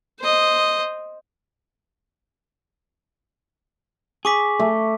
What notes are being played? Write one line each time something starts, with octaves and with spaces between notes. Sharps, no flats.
C5 D#5
G#4 C#6 D6 B6
A3